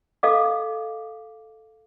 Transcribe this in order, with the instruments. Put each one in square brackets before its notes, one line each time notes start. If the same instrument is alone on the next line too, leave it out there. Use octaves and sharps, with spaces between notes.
[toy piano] A4 D#5 F5 D6